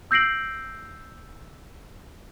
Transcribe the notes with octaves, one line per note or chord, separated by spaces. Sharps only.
E6 G6 A#6 C7 D7 F#7